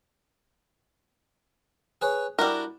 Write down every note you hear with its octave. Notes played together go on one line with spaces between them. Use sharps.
G#4 B4 C#5
G3 D4 E4 F#4 A#4